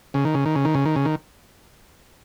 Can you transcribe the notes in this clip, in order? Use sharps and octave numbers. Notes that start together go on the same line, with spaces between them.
C#3
D#3
C#3
D#3
C#3
D#3
C#3
D#3
C#3
D#3